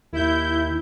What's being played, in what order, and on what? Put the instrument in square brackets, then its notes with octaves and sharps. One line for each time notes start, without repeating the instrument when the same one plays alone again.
[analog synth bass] D#2 [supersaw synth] E4 G6